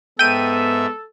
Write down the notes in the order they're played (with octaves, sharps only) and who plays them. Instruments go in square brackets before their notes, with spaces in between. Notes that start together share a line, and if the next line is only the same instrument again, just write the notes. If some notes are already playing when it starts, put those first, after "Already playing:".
[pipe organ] G#2 E5 [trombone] B3 [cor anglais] A4 [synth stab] G5 D#7